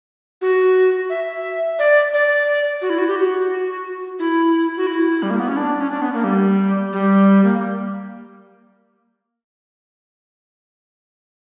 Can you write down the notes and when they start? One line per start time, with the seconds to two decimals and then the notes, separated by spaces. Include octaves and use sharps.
0.42 F#4
1.10 E5
1.79 D5
2.13 D5
2.82 F#4
2.90 E4
2.99 F#4
3.08 G4
3.16 F#4
4.19 E4
4.77 F#4
4.87 E4
5.23 G3
5.30 A#3
5.39 B3
5.48 C#4
5.57 D4
5.81 C#4
5.91 D4
6.02 B3
6.13 A#3
6.24 G3
6.93 G3
7.44 A#3